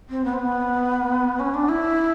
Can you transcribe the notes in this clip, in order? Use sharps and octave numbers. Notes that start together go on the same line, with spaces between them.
C4
B3
C4
B3
C#4
D4
E4